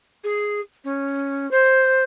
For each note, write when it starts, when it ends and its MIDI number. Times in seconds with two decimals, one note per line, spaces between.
0.24 0.60 68
0.84 1.49 61
1.51 2.03 72